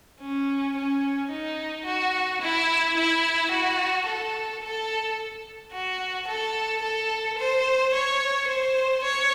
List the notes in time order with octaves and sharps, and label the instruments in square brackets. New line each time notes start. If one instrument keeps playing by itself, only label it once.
[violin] C#4
C#4
D#4
F#4
E4
E4
F#4
A4
A4
F#4
A4
A4
C5
C#5
C5
C#5